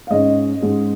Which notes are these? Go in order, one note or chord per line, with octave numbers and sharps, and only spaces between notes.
F5
G#2 G#3 C#4 D#5
G#2 G#3 C#4